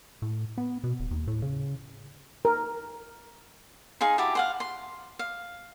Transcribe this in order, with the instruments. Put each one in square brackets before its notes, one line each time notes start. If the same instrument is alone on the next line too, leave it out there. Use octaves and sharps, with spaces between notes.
[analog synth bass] A2
B3
B2
D#1
D#2
A2
C#3
[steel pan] A#4
[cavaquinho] D#4 G#4 F5 C6
E4 F#4 G4 A5
F5 F#5 C6
C6
F5